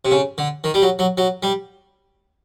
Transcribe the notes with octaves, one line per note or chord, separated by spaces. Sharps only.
C3
C#3
D3
D#3
G3
F#3
F#3
F#3
G3